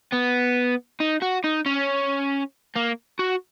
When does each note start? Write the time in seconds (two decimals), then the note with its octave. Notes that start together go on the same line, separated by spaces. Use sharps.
0.12 B3
1.00 D#4
1.22 F#4
1.44 D#4
1.66 C#4
2.75 A#3
3.19 F#4